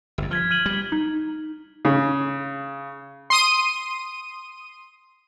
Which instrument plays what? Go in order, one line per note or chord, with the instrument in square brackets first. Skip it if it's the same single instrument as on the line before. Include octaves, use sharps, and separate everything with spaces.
[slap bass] G1 F2
[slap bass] F3 [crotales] F6 G#6 B6
[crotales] F6 D#7 F#7
[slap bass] G3
[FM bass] D#4
[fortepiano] C#3
[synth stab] C6 D#6 D#7